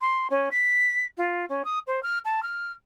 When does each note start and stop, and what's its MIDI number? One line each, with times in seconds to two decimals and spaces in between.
0.01 0.28 84
0.30 0.49 61
0.51 1.05 95
1.17 1.45 65
1.49 1.63 61
1.65 1.79 87
1.87 2.00 72
2.03 2.18 89
2.25 2.43 81
2.43 2.72 89